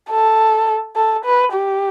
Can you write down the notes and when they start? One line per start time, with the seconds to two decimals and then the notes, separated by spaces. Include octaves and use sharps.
0.11 A4
0.96 A4
1.25 B4
1.53 G4